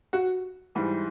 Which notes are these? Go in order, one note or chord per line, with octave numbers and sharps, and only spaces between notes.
F#4
G#2 E3 G3